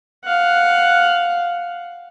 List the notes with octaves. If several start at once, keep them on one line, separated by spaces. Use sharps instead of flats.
F5 F#5